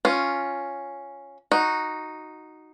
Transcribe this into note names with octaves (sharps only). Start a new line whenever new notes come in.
C#4 F4
D#4 F#4